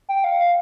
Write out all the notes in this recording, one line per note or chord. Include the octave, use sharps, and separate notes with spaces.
G5
F5
F5